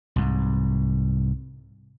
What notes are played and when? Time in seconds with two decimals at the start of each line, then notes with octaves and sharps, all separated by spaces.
0.16 C2 G#2